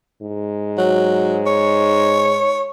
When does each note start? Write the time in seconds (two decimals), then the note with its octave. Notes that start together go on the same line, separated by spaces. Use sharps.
0.22 G#2
0.78 F#3
1.47 C#5